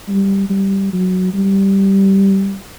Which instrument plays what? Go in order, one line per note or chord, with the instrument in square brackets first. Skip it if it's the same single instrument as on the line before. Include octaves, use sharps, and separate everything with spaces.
[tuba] G3
G3
F#3
G3